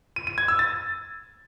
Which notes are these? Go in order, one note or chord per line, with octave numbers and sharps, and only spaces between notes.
D#7
D#7
G#6
E6
A6